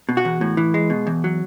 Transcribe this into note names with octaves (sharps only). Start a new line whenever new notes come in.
B2
F#4
E2
A2
E3
G#3
B2
E2
F#3